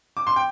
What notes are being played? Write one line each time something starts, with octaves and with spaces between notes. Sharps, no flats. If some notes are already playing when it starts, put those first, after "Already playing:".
D6
C6
G5